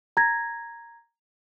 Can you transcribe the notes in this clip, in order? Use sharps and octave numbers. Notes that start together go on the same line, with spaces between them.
A#5 G#6 A#6